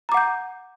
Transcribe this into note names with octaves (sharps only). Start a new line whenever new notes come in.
F#5 A#5 D6 G6